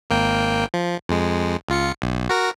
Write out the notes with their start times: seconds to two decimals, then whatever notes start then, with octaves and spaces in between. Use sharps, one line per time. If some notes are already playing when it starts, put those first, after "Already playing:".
0.10 G#1 A#3 G5
0.74 F3
1.09 F2 G#3
1.69 C#2 F4 C#7
2.02 B1
2.29 F#4 A#4 A#6